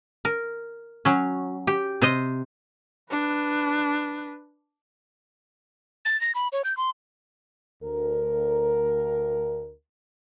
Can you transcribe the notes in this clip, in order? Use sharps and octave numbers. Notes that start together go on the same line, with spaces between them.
A#4
F#3 C#4
G4
C3 C5 D#5
D4 B4
A6
A#6
B5
C#5
G6
C6
D2 A#4